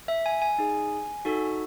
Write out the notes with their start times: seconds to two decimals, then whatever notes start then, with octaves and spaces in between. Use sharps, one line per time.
0.08 E5
0.26 G#5
0.42 G#5
0.58 D#4 G#4
1.25 D#4 F#4 A4